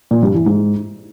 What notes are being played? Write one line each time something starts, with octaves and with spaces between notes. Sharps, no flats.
A#2
G2
E3
G#2